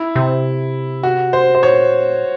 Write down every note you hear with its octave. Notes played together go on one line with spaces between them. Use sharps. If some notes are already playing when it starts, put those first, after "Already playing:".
Already playing: E4
C3
F#4
C5
C5
A#2 C#5